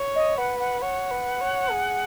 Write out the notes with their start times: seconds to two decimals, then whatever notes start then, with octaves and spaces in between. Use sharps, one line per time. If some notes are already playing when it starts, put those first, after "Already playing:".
Already playing: C#5
0.15 D#5
0.37 B4 F#5
0.59 F#5
0.81 C#5 F#5
1.11 B4
1.41 C#5
1.71 G#4